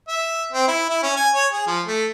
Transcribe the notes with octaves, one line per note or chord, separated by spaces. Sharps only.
E5
C4
E4
E4
C#4
G#5
C#5
G#4
F3
A3